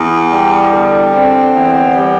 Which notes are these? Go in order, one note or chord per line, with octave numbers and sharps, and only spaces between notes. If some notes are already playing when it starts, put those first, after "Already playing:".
Already playing: E2
G3
D3
C4
E2
G3